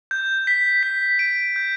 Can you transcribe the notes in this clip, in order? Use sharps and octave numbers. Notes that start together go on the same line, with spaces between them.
G6
B6
B6
D7
G6